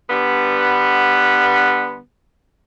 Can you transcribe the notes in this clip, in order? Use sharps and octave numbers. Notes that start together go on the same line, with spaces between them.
D3 G3 B3